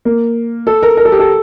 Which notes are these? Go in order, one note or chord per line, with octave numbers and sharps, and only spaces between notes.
A#3
A4
A#4
A#4
A4
G4
A4